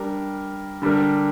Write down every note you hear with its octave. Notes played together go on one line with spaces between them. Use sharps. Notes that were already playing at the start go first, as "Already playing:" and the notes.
Already playing: G3 D4 A#4
D3 G3 D4 A#4